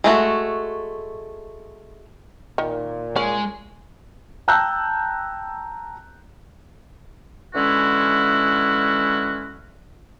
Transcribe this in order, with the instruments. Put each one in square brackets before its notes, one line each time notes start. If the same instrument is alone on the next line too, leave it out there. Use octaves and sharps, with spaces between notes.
[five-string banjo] G#3 A3 F#4
[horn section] A#2 [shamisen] D#3
[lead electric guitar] G#3 [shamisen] C#4
[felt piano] G5 A5 A#5 E6 F#6 G6
[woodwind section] D3 E3 G#3 C#4 E4 F#4